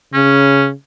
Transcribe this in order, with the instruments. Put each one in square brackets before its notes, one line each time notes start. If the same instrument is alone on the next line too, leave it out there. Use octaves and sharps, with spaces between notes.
[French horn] C#3 [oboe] C#4